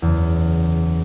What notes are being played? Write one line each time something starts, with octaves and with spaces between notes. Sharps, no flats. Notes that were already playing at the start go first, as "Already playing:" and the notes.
F#1 E2